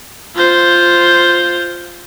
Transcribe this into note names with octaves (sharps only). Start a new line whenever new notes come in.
F4 C5